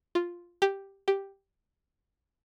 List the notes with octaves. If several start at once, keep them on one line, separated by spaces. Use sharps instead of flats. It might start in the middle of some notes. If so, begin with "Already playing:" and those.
F4
G4
G4